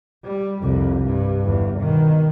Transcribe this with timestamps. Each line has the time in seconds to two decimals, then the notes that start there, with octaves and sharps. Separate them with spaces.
0.25 G3
0.62 C2 F2
1.05 G2
1.44 G1 E2
1.79 B2 D#3